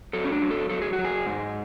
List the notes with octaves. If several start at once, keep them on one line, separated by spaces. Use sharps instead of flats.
F#3 A4
C#4
D4
F#3
A4
F#3 A4
G#4
F#4
F#3
G#4
G#2